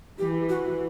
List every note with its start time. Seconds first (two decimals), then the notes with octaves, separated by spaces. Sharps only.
0.19 E3 G4
0.49 F#4